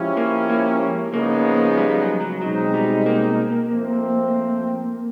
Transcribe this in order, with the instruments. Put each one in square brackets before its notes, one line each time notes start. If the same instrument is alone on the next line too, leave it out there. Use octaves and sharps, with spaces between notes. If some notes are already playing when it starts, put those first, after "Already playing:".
Already playing: [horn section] F3 G#3 C#4 E4 G4
[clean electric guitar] A#3
A#3
[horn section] C#3 F3 G#3 B3 D#4 [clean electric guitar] A#3
[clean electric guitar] G3
F#3
F#3
[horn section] B2 G#3 C4 D#4 [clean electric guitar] F#3
[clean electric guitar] G3
A#3
[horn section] F3 A3 C4